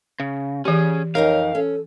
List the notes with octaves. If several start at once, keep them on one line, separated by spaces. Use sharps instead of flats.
C#3
E3 C#4 G4 G#4
F2 D#4 A#4 C#5 F5
C#4 A4